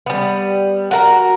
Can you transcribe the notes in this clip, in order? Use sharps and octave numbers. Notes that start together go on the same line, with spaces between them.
G3 B3
F#4 A#4 A#5